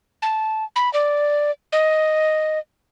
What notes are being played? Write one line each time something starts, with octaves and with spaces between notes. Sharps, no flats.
A5
B5
D5
D#5